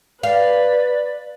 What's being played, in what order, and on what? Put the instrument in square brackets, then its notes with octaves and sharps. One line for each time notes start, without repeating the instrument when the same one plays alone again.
[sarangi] B4 [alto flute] D5 [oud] F5